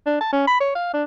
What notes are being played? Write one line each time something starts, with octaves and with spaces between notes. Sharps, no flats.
D4
A5
C#4
B5
C#5
F5
D4